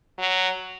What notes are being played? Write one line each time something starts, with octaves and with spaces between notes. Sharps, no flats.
F#3